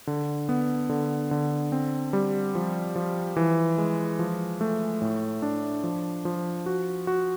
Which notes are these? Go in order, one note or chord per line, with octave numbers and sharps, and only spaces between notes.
D3
B3
D3
D3
C4
G3
F3
F3
E3
G#3
F3
A3
A2
D4
F3
F3
F#4
F#4